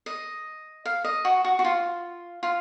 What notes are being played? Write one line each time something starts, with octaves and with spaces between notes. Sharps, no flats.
D#5
F5
D#5
F#4
F#4
F#4
F4
F4